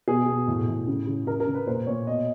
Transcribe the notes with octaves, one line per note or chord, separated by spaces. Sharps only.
B2 G#4
B2
A2
A2
C#3
C#3
C#3 A#4
A#4
C#3
B4
A#2 C5
A#2 C#5
B2 D#5